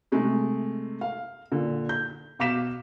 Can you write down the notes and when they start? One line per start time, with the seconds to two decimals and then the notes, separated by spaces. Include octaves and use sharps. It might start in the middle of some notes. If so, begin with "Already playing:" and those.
0.12 C3 G#3 A3
1.01 F5
1.51 A#2 D3
1.89 G6
2.39 B2 F5 D6 B6 E7